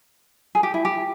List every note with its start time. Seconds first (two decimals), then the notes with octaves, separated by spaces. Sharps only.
0.55 G#4
0.63 G4
0.74 E4
0.85 G4